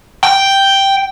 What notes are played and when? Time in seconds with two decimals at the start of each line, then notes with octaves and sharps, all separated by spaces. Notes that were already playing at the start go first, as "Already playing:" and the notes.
0.24 G5